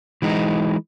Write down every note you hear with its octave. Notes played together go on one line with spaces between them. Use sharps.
E3 G#3 D#4